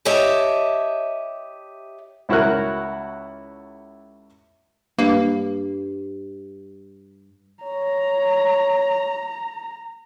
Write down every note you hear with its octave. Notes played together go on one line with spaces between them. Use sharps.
G4 C#5 D#5 E5 A5
C#2 E4 F#4 A#4 F#6
G2 A#3
C#5 A#5